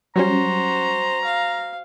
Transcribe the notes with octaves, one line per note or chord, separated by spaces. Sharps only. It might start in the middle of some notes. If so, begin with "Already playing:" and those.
F#3 G3 C#4 F#4 C5 A#5
F5